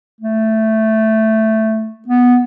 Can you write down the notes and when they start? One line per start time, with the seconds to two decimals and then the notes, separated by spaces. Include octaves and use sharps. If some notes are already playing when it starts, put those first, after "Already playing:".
0.21 A3
2.08 B3